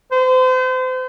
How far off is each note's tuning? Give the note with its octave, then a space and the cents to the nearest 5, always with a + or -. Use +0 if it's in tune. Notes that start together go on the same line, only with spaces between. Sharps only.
C5 -35